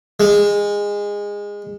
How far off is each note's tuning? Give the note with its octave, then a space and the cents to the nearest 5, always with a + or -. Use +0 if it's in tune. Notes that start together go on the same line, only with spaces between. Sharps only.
G#3 -20